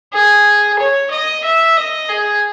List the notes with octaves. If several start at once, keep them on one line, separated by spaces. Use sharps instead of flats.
G#4
C#5
D#5
E5
D#5
G#4